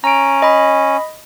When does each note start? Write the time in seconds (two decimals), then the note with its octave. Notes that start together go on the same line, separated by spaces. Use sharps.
0.04 C#4 A#5 D7
0.42 D#5 B5